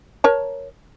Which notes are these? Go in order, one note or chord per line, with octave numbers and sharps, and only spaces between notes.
A#4 C#5 A5